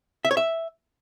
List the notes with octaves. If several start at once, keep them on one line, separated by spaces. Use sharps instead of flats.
E5
C#5
E5